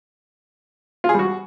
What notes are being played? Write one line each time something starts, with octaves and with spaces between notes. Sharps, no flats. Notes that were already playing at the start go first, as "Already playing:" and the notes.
F4
G#4
G3
F#4